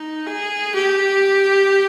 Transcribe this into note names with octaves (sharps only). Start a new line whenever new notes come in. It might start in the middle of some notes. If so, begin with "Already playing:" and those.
Already playing: D#4
G#4
G4